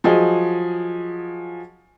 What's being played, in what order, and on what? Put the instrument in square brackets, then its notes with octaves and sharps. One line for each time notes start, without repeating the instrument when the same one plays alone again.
[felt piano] F3 F#3 G#4 D#5